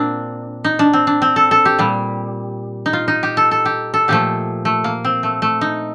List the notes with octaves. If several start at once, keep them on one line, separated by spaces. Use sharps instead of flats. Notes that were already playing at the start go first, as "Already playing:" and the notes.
Already playing: A#2 A#3 C4 D4
D#4
D4
C4
D4
C4
A4
A4
G4
A#2 G3
D#4
F4
D#4
G4
A4
A4
G4
A4
A#2 F3 A3 G4
A3
A#3
C4
A3
A3
D#4